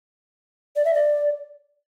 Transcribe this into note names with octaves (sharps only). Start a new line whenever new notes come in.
D5
E5
D5